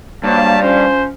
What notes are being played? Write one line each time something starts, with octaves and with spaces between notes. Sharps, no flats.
G2 F3 F#3 A#3 A5
F3 C#4 C5